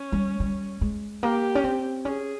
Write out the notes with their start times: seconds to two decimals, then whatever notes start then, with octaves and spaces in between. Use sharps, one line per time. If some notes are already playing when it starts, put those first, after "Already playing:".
Already playing: C#4
0.12 G3
0.40 G3
0.81 G#3
1.23 A#3 G4
1.55 C#4
1.64 C4
2.05 C#4 G#4